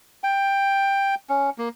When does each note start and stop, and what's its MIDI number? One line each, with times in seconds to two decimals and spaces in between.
0.24 1.15 79
1.29 1.50 61
1.58 1.69 58